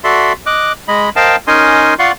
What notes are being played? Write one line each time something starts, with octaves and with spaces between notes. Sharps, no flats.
F#4 A4 D5 E5 C6
D#5 D6 F#6
G#3 D#5 B5
A#4 C5 D#5 F5 G5 A5
C#4 D#4 A#4 D#5 G#5 C6
F4 D5 F5 F#5 C6 C#6